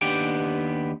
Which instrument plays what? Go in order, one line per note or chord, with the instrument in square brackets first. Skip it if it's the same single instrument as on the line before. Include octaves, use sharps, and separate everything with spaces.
[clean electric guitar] D#2 B3 D4 G4 G5